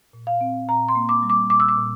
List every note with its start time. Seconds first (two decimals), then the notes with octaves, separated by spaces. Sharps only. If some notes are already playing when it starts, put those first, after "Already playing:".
0.13 A#2
0.27 F5
0.41 C4
0.68 A#2 A#5
0.89 C6
0.95 A#3
1.09 D6
1.23 G3
1.30 D6
1.50 A#2 D6
1.60 E6
1.69 D6
1.78 A#2